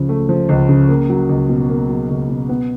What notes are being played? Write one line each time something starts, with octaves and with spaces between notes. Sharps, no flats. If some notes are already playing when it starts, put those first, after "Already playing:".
Already playing: C#2 C#3 F3
A3
F3
C#2
C#3
A#3
F#3
C#2
B2
A#3
F#3
C#2
B2
B3